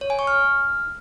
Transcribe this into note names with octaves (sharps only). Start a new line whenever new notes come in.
C#5
G#5
C#6
F6